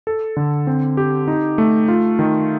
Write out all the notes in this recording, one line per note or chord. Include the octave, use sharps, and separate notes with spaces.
A4
D3
C4
G4
D#4
A3
F4
D#3